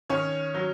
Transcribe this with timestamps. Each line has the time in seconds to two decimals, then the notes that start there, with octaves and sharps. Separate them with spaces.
0.10 D#3 C#4 C#5
0.54 F#3